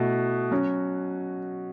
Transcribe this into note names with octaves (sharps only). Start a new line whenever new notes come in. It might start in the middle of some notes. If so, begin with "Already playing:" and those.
Already playing: B2 A3 E4
F#3 C#4 F#4